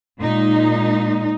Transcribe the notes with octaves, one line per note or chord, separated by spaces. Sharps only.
A#2 G#3 D#4